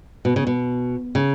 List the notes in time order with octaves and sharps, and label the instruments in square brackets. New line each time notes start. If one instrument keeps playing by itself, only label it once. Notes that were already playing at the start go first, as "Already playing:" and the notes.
[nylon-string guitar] B2
C#3
B2
C#3